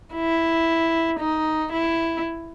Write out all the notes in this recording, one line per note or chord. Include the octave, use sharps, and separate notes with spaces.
E4
D#4
E4